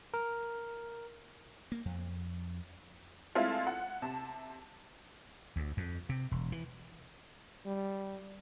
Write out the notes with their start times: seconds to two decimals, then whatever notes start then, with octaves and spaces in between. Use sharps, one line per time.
0.14 A#4
1.72 A#3
1.85 F2
3.35 G#3 A3 C4 E4 F4 A4
3.67 F#5
4.02 C3 A5
5.56 D2
5.77 F2
6.09 C3
6.31 E1
6.52 E3
7.66 G3